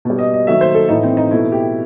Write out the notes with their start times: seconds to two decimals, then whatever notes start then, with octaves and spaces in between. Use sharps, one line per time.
0.05 B2 G3
0.19 D#5
0.34 D#5
0.47 D#3 F#3 A3 E5
0.61 C5
0.75 A4
0.89 A2 E3 A3 D#4
1.03 C4
1.17 D#4
1.31 B2 A3 E4
1.52 G4